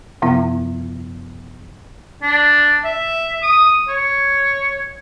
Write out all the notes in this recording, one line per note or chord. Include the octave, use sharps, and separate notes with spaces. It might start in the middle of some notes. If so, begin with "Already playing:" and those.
F#2 C3 F3 B3 E4
D4
E5
D#6
C#5